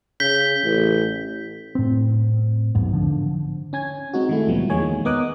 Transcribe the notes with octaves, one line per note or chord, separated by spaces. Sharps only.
C#3 G6 B6 G7
A1
A2 C4
E1 B1 G#2
D3 F3
C#4 G#5 G#6
G#3 C4 D#4 F#4
D#3 G#3 A3 E4
D2 A#2 F3 G3 B3
E2 D#3 G#3 A#3 C#5 G#5
B3 A#4 D#5 D6 D#6 F#6